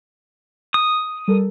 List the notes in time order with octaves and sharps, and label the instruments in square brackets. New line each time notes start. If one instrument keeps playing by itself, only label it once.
[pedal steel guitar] D#6
[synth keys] G3 A4 A#4